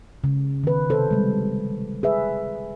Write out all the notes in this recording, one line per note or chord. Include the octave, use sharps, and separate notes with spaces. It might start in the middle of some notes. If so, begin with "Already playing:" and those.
C#3
D#3 B4
C3 A4 C5
G3 G#3
G#4 B4 E5